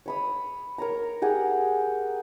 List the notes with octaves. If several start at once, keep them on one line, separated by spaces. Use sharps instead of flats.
C#5 B5 D#6
A#4 C#5 A#5
G4 G#4 F#5